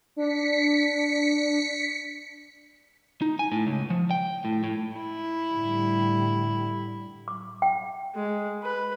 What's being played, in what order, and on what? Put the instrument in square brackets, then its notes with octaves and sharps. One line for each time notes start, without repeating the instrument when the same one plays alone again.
[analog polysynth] D4 [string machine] B6 C#7
[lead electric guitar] D#4
G#5
A2
C#2
F3
G5
A2
A2
[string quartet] E4
[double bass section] A2 D3 G3
[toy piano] D6
G5
[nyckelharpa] G#3
B4